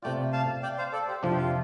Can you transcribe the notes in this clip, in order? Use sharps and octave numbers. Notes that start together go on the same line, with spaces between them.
C3 A3 F4 D5 G5
F5 A5
D5 G5
C5 F5
A4 D5
G4 C5
F2 C3 F3 D4 F4
G4
F4